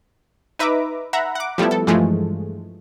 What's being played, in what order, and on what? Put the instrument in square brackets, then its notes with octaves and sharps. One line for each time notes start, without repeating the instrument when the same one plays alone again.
[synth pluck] D#4 B4 E5 A#5 D6
E5 F#5 A#5 B5
F#5 D6
F3 G3 A3 B3 E4
A4
G2 E3 F3 G#3 A3